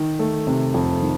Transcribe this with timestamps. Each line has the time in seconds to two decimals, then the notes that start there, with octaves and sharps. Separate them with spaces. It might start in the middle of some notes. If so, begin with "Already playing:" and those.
Already playing: D#3
0.19 A3
0.47 C3
0.74 F2
1.02 D#3